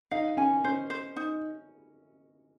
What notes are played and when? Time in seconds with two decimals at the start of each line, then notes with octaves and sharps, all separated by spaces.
0.11 D#4 F5
0.37 C#4 G#5
0.64 C#4 C5
0.90 C5
1.16 D#4